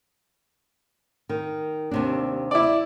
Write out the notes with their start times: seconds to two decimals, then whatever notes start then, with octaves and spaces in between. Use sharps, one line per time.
1.29 D#3
1.91 D#2 C3 D4
2.51 E4 D5